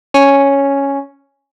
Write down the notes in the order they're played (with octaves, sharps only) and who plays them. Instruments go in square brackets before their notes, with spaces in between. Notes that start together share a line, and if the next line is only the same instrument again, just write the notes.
[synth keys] C#4